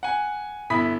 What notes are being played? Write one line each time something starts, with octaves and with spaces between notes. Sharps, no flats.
F#5 G#5
G1 E4 B5 D#6 B6